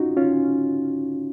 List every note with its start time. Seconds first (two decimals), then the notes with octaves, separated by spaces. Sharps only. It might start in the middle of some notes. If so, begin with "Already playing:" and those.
Already playing: C#4 D#4 F4 F#4
0.17 C#4 F4